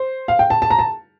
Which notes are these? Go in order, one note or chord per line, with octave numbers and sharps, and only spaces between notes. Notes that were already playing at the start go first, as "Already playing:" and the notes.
Already playing: C5
F5
G5
A5
A5
A#5
A5